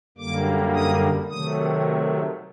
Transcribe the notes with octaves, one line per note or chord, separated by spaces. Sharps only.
F#2 D3 G3 A#3 D6
D#6
C3 D#3 F#3 A3 D#6